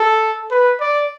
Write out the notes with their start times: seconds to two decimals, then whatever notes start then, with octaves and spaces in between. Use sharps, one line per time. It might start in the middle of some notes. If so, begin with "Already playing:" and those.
Already playing: A4
0.51 B4
0.80 D5